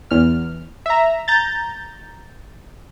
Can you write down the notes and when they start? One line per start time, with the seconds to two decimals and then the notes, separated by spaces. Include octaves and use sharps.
0.11 E2 F6
0.86 E5 A#5
1.28 A#5 G6 A6